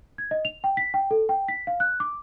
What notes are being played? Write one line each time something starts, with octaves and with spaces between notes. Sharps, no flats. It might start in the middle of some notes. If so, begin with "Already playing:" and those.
G#6
D#5
F7
G5
B6
G5
A4
G5
B6
F5
F#6
D6